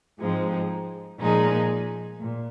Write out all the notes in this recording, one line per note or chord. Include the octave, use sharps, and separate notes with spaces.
G#2 F3 G#3 C4 D#4
A#2 F3 G#3 D#4 G#4
A#2